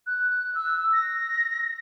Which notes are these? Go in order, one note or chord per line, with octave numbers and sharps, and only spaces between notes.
F#6
E6
A#6